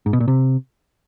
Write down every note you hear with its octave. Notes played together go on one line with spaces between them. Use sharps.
G#2
B2
A#2
C3